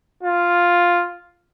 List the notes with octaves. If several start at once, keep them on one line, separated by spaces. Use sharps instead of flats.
F4